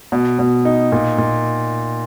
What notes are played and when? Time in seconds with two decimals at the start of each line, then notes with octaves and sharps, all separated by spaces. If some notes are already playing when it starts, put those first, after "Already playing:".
0.12 B2
0.39 B2
0.65 D#4
0.92 A#2
1.18 A#2